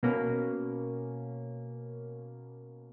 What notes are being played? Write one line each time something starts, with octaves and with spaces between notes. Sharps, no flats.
B2 A#3 C#4